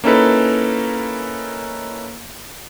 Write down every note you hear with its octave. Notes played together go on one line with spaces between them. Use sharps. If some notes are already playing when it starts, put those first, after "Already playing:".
A#3 C#4 D#4 E4 A4 B4